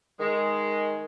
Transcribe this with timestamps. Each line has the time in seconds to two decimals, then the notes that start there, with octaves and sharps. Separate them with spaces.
0.20 D#3 G#3